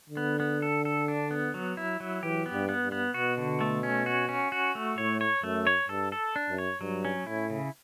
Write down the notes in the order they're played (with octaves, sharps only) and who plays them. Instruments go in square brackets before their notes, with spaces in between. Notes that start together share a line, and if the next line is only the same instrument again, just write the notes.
[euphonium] D3
[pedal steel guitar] B3
B3
A4
A4
D4
B3
F#3
E4
F#3
[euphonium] E3 [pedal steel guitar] G4
[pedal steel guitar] B3
[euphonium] G2
[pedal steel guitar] B3
[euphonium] G2
[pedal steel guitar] B3
[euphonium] B2 [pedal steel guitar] F#4
[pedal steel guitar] D3
A3
C#4
F#4
C#4
F#4
A3
[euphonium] A2 [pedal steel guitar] C#5
[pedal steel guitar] C#5
[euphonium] F#2 [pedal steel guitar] A3
[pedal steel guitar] C#5
[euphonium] G2 [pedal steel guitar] A4
[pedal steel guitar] A4
D4
[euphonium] F#2
[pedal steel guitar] C#5
[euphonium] G2 [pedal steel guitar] F#3
[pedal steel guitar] C#4
[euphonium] A2 [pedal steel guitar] E4
[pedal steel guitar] C#3